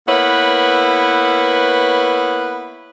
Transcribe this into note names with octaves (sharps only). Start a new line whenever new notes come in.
A#3 B3 E4 B4 C#5